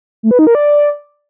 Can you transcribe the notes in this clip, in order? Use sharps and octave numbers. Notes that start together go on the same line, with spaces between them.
A3
B4
D#4
A#4
D5